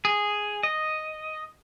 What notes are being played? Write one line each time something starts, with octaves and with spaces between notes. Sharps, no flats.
G#4
D#5